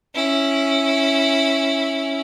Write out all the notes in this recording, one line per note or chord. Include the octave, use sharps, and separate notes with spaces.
C#4 E4